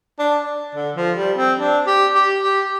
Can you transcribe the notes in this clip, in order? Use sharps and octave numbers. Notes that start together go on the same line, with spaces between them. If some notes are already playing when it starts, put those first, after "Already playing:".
D4
D3
F3
G3
C4
D4
G4
G4
G4